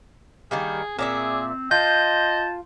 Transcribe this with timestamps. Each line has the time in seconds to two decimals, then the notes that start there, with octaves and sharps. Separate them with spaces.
0.51 D#3 G3 A#3 G#4
0.99 A#2 C4 G#4 D5 E5
1.71 F4 D#5 A5 G6